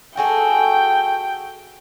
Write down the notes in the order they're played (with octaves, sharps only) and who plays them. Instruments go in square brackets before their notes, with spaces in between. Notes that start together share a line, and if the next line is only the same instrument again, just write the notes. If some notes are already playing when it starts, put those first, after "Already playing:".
[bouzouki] F#4 G#4 A4 [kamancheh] G5